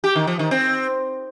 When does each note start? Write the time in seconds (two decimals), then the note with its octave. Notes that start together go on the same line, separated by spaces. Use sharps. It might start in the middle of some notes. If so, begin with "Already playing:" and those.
0.04 G4
0.16 D#3
0.27 F3
0.39 D#3
0.51 C4